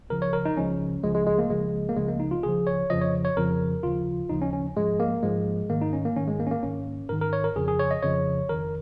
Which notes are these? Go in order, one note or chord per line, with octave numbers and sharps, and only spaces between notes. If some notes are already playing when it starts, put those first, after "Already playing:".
C#2 C#3 F3 A#4
C#5
A#4
D#4
C#2 C#3 F3 C#4
C#2 C#3 F3 G#3
G#3
G#3
A#3
C#2 C#3 F3 G#3
A#3
C#2 C#3 F3 G#3
A#3
D#4
F4
C#2 C#3 F3 G#4
C#5
F2 C#3 F3 D#5
C#5
C#5
F2 C#3 F3 A#4
D#2 C#3 F3 F4
D#2 C#3 F3 D#4
C#4
C#4
G#2 F3 G#3
A#3
G#2 F3 G#3
G#2 D#3 A#3
D#4
C#4
A#3
G#2 D#3 C#4
G#3
A#3
C#4
A#3
G#2 D#3 C#4
G#2 D#3 A#4
A#4
C#5
A#4
F2 C#3 F3 G#4
G#4
C#5
D#5
F2 C#3 F3 C#5
F2 D#3 A#4